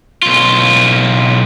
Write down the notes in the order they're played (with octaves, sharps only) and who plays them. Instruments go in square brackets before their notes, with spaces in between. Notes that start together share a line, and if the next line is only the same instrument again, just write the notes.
[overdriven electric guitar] B1 F4